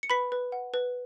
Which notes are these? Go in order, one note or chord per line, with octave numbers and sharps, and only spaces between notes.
C#7
B4 B5 B6
B4
F#5
B4